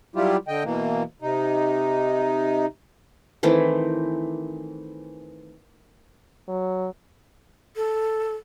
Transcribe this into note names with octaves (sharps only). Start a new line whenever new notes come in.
F#3 G3 E4 F4 G4
D3 D#5 G5
B2 E3 A#3
C3 D#4
D#3 E3 A3 C4
F#3
A4